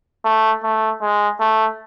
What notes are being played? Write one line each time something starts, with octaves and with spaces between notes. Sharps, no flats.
A3
A3
G#3
A3